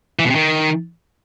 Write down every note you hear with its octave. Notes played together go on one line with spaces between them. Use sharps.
E3
B2
C3
D#3